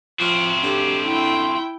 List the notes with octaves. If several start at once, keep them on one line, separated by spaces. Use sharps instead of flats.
F3 C4 F#4
D3 G4
E4 G5